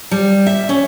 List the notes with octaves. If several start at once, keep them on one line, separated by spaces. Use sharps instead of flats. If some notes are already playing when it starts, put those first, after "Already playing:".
G3
E5
C#4